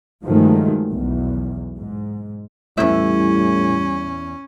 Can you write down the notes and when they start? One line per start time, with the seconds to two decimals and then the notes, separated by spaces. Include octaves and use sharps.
0.24 G2 D#3 F3 F#3 G#3 A3
0.89 B1 E2
1.78 G#2
2.77 E2 A2 G3 C#4 E5